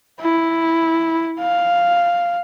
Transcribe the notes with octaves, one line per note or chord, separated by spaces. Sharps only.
E4
F5